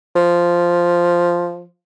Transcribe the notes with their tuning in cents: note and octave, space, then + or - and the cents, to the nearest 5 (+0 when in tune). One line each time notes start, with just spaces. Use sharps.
F3 -5